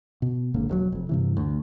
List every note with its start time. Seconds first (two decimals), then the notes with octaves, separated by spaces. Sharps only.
0.22 B2
0.54 D1 G#1 D3 A#3
0.69 E1 A2 F#3
0.92 F1 F2
1.09 G2 C3 E3
1.37 D2